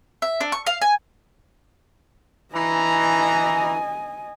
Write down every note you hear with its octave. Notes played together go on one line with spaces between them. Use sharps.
E5
D4
C#6
F5
G#5
E3 D#5 G#5 A#5